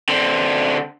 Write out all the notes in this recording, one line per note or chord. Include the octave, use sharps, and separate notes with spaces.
D3 C4